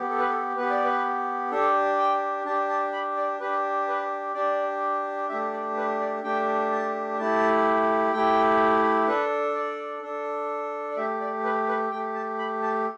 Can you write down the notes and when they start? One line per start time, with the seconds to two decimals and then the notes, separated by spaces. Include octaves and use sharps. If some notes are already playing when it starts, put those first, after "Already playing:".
Already playing: B3 G4
0.10 A4
0.19 B4
0.29 A4
0.56 B3 G4 B4
0.70 D5
0.84 B4
1.51 D4 G4 A4
1.99 G5
2.45 D4 G4 A5
2.69 A5
2.93 B5
3.17 D5
3.40 D4 G4 B4
3.87 B4
4.34 D4 G4 D5
5.29 A3 D4 G4 E5
5.53 D5
5.77 B4
6.00 D5
6.24 A3 D4 G4 G5
6.72 A5
7.18 A3 E4 G4 A5
8.13 A3 E4 G4 G5
9.08 D4 A4 B4
9.55 D5
10.02 D4 A4
10.91 D5
10.97 A3 G4 E5
11.20 D5
11.44 B4
11.68 B4
11.91 A3 G4 G5
12.15 A5
12.38 B5
12.62 A5